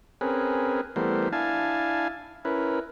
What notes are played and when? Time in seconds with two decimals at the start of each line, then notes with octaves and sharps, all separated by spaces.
0.21 C4 C#4 G#4 A#4 B4
0.96 E3 G3 A3 B3 A#4 C5
1.33 D4 E4 F5 G#5 A5
2.45 C#4 E4 A#4 B4